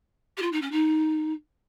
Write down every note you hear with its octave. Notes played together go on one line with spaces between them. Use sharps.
G4
F4
D#4
C#4
D#4